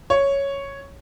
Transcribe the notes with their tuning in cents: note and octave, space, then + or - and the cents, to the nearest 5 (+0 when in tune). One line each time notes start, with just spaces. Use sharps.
C#5 +0